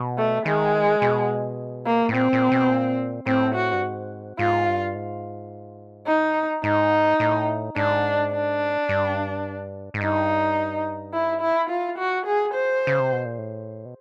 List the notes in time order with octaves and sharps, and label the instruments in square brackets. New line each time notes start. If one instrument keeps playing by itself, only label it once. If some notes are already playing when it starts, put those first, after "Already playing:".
Already playing: [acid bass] B2
[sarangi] A3
[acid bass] D#3 [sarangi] G#3
[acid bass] B2
[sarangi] A#3
[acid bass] A2
[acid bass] A#2 [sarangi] C4
[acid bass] A#2
B2
A#2
[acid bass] A2 [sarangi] C4
[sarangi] F#4
[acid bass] G2
G#2
[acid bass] G#2 [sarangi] F4
[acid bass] G2
G#2
[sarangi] D#4
[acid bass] G#2 [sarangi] D#4
[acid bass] A2
[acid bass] G#2 [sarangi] D4
[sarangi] D4
[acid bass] G2
G#2
[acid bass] G2 [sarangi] D#4
[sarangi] E4
E4
F4
F#4
G#4
C5
[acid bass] C#3
C3
B2
A#2
A2
B2